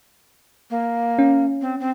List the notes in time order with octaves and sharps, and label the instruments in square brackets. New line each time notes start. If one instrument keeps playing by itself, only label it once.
[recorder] A#3
[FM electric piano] C#4
[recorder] C4
C4